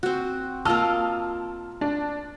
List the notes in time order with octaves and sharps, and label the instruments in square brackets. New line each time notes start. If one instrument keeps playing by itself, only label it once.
[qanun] C4 F#4
[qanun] A#3 F4 D#5 [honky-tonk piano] A5 E6 F6
[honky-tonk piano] D4